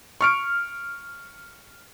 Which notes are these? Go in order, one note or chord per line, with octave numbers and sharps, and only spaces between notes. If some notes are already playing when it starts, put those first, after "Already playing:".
C#6 F6 D7